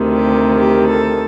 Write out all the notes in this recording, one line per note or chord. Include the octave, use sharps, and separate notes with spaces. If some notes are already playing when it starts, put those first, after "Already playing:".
Already playing: D2 C3 D#3
G4
G4
A4